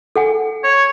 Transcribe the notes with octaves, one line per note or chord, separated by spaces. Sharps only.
A4 F#5 G#5
C#5